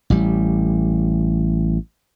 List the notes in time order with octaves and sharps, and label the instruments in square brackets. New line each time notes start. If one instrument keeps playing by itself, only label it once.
[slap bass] A1 G3